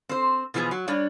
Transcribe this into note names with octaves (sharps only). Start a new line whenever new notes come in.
C4 C5
B2 E3 F3 B3 G#4
F#3
G3 D4 C#5 D5